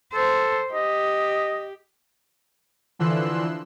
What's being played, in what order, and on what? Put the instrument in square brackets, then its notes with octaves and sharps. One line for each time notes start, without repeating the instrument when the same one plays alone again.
[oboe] A4 [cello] C5
[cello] G4 [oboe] D#5
[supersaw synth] D3 E3 F3 C6 E6 F#6